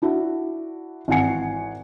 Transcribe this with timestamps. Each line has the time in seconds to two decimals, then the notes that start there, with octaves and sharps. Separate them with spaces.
0.02 D4 E4 F#4
1.08 G#1 E3 F#5 G#5 C#7